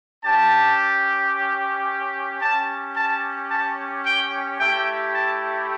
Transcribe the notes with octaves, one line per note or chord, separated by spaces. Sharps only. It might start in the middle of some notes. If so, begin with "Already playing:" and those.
C#4 G4 A5
C#4 G4 A5
A5
A5
G5
A3 E4 G4 G5
A5